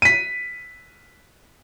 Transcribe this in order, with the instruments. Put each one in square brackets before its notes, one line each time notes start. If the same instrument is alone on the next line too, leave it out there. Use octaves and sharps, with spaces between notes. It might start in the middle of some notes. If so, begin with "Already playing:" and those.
[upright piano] B6 D#7